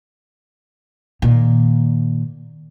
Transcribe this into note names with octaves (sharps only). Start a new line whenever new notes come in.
A#2 D#3